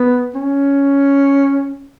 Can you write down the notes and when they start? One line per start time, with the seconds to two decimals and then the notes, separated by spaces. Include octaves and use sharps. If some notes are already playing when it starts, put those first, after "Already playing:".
Already playing: B3
0.35 C#4